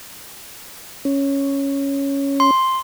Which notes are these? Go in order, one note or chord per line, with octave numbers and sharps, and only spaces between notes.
C#4
C6